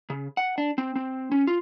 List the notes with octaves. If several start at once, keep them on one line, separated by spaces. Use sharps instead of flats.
C#3
F#5
D4
C4
C4
C#4
F4